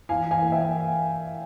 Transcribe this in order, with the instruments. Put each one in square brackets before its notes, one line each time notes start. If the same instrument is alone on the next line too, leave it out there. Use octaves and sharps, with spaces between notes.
[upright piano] E3 F5 G#5
E3
F5 G#5
A#3
E5 G5
A#3